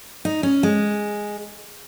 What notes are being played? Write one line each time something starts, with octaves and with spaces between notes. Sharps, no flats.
D#4
C#4
G#3